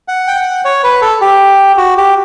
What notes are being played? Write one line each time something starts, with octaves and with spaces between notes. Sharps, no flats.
F#5
G5
F#5
C#5
B4
A4
G4
F#4
G4